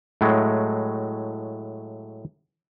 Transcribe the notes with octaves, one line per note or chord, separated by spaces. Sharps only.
A2 F#3 G#3 A3